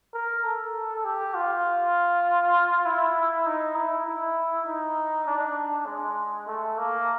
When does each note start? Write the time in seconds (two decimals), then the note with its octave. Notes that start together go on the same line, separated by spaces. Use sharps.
0.14 A#4
0.44 A4
1.04 G4
1.35 F4
2.86 E4
3.46 D#4
3.76 E4
4.06 E4
4.66 D#4
5.27 D4
5.87 G#3
6.47 A3
6.78 A#3